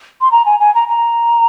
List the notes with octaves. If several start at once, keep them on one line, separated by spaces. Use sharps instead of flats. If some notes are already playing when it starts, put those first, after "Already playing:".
C6
A#5
G#5
G#5
A#5
A#5